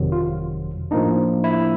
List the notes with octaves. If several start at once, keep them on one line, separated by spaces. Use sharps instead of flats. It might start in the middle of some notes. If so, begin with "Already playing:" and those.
Already playing: G1 F2 C3 D#3 F#3
F4
A2 F3 A#3 D4 D#4
E4